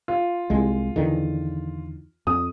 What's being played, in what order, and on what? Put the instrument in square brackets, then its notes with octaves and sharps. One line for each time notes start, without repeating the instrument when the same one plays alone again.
[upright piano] F4
[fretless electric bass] C2 G#3
E2 D3 D#3
[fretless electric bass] F2 [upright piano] D#6